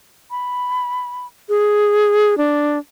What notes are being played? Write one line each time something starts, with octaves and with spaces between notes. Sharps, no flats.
B5
G#4
D4